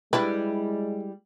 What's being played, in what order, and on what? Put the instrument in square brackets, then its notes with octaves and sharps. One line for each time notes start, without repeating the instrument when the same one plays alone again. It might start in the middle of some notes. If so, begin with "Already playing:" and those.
[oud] G3 E4 G4 [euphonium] G#3 [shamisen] D4 B4